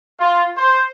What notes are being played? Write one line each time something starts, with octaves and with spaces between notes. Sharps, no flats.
F4
C5